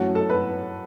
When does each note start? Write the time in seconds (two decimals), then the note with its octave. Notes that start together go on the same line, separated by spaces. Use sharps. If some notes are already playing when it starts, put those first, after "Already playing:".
Already playing: F#2 E3 A3 C#4 F#4 F#5
0.15 A4 A5
0.30 B4 B5